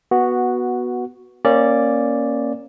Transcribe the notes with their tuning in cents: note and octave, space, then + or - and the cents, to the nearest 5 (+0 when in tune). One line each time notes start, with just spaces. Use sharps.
B3 -10 F#4 +0
A#3 +0 C#4 -20 D5 +0